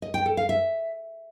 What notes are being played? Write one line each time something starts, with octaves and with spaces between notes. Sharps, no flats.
D#5
G5
A4
F5
E5